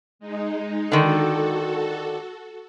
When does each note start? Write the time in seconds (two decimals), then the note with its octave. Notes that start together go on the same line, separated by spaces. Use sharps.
0.19 G#3 D#4
0.92 D3 D#3 F#4 A4